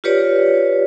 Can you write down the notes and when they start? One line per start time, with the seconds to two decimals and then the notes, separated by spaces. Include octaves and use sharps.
0.04 F4 G4 B4 C#5 D5